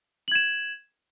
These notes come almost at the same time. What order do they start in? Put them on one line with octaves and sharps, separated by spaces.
F#7 G#6 E7